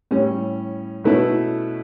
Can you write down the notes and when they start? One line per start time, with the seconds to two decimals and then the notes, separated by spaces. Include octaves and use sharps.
0.11 A2 G3 C#4
1.04 B2 A3 C#4 E4 B4